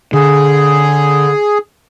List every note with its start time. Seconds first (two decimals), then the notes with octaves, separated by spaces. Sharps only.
0.13 D3 G#4